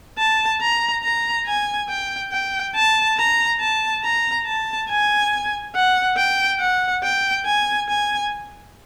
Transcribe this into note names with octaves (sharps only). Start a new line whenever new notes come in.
A5
A#5
A#5
G#5
G5
G5
A5
A#5
A5
A#5
A5
G#5
F#5
G5
F#5
G5
G#5
G#5